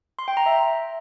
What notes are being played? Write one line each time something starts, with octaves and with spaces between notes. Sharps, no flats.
C6
G5
A#5
E5